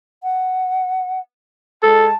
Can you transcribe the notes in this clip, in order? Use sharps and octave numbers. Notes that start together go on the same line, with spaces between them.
F#5
G#3 A4 A5